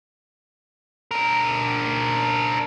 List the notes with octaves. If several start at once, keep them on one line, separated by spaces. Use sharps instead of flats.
D4 A#4